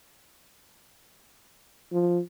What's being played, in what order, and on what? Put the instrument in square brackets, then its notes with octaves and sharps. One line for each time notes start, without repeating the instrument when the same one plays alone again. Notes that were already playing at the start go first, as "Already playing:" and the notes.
[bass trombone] F3